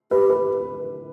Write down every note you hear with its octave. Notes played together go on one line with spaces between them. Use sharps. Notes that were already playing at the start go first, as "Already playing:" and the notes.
G4 B4
B4